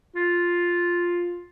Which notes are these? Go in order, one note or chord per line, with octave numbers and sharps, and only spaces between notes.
F4